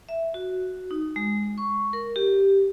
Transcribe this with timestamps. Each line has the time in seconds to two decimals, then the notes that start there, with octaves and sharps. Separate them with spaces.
0.09 E5
0.34 F#4
0.91 D#4
1.16 G#3
1.58 C#6
1.93 A#4
2.16 G4